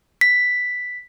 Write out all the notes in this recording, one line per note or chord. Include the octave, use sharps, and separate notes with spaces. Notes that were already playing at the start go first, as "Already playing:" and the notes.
B6